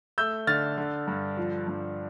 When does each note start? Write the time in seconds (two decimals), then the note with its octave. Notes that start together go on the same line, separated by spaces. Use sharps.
0.18 A3 E6 G6
0.47 D3 F6 A6
0.78 D3
1.07 G2
1.37 F3
1.68 G2